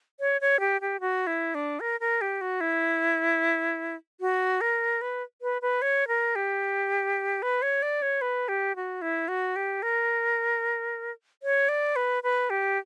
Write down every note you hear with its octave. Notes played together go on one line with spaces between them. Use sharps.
C#5
C#5
G4
G4
F#4
E4
D4
A#4
A#4
G4
F#4
E4
F#4
A#4
B4
B4
B4
C#5
A#4
G4
B4
C#5
D5
C#5
B4
G4
F#4
E4
F#4
G4
A#4
C#5
D5
B4
B4
G4